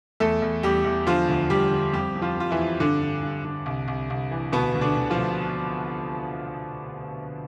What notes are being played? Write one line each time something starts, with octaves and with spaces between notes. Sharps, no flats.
E2 A3 A4
E2
E2 G3 G4
E2
D3 F3 F4
D2
D2 G3 G4
D3
F2 G3 G4
F2
F3 F4
F2 F4
E3 E4
F2
G2 D3 D4
G2
G2
D3
C2
C2
C2
E3
D2 B2 B3
D2
D3 D4
D2
F3 F4
D2